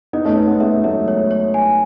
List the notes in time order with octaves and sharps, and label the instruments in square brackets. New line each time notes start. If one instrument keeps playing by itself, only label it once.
[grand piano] B3 D#4 [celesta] D#5
[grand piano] A3 C#4
[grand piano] A3 C#4 [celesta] B4
[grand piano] G#3 B3
[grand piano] G#3 B3 [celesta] E5
[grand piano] F#3 A3 [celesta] E5
[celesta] C#5
C#5
G#5